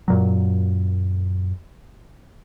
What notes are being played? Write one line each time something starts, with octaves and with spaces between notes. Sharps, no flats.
F#2 A#2 F#3